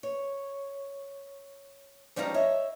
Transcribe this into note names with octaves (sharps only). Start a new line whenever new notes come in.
C#5
F3 G3 G#3 C#4 D#4
C#5 D#5 E5